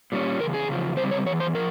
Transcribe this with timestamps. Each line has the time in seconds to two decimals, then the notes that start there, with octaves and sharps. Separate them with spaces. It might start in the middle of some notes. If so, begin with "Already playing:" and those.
0.12 A#2 G3 C#4
0.40 E2 C#3 A#4
0.54 G#4
0.68 E2 C#3 F3
0.97 C#3 G3 C4 C5
1.11 C#5
1.26 E2 E3 C#5
1.40 C5
1.55 F3 A#4